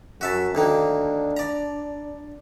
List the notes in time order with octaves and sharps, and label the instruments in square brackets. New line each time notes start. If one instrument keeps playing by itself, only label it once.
[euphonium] F#2 [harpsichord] F#4 E5 A5
[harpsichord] D2 D#3 A#3 [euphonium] D4
[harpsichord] D5 A#5